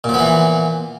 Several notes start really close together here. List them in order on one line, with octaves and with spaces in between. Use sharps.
A#2 F3 B3 E3